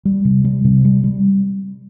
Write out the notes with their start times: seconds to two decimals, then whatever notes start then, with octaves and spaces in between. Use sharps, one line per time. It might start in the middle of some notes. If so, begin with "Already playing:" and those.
0.05 G3
0.25 C3
0.44 G3
0.64 C3
0.85 G3
1.04 G3